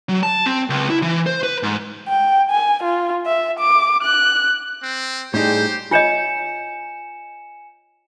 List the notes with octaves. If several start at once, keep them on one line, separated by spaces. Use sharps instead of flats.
F#3
A5
C4
C#2
E4
E3
C5
B4
G#2
G5
G#5
F4
E5
D6
F#6
C4
A2 G3 D#4 G4 G#4 C5
F4 C#5 D#5 G#5 C#7 E7